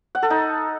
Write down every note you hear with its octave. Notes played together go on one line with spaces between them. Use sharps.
F#5
A4
D#4